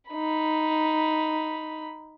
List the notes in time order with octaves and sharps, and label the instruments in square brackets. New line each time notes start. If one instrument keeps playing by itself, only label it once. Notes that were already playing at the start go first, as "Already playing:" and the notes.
[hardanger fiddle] D#4 B5